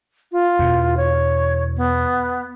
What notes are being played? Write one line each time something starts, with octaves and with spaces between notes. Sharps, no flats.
F4
E2 B2
C#5
B3